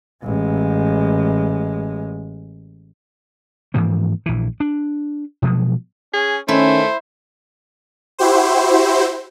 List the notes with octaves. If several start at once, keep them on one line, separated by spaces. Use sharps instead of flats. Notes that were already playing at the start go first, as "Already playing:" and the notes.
A1 G#3
G#2 E3 F3 A#3
A#1 E3
D4
B2 F3 F#3 G#3
C#4 G#4
D#3 A3 C#4 E4 C5
E4 F#4 G4 C5